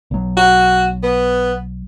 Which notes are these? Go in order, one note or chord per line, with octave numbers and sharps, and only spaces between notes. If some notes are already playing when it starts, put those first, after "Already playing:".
B1 F#3
F#4
B3